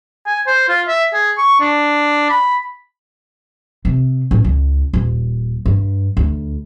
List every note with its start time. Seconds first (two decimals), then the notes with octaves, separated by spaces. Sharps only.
0.26 G#5
0.47 C5
0.69 F4
0.88 E5
1.14 G#4
1.38 C#6
1.60 D4
2.30 B5
3.85 C3
4.31 A1
4.44 C#2
4.93 D#1
5.66 G2
6.17 D2